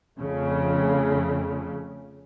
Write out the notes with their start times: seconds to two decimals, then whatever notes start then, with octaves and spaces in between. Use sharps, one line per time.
0.18 F2 C#3 A3